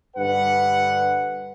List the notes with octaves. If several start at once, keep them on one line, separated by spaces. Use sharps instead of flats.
G2 D3 B4 F#5